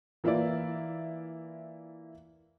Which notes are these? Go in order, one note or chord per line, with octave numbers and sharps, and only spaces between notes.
E3 A#3 E4 F4 D5